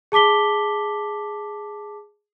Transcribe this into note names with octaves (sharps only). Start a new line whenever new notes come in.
G#4 A5 D6 B6 G7